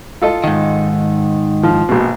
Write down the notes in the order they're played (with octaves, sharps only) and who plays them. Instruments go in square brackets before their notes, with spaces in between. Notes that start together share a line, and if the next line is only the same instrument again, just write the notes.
[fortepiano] F4 A4 D#5
[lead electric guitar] G#2 D#3
[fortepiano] F3
A#1 B2